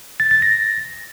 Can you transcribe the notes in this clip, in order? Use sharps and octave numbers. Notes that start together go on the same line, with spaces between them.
A6
A6
A#6